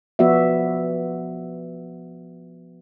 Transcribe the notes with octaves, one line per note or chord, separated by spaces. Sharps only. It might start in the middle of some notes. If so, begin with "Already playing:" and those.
F3 B3 F#4 D5 E5